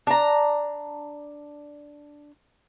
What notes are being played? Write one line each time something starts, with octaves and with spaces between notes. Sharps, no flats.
D4 A#5